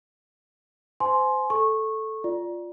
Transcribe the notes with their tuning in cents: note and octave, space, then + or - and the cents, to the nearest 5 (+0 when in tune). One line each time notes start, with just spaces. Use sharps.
C5 -25 G#5 +30 C6 +5
A4 +0 C#6 -15
F4 +0 D5 +0